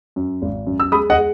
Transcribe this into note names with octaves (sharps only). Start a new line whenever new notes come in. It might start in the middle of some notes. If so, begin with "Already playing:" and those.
F#2
G#1
F#2
E6
G#3 B5 D#6
D#5 F#5
G#3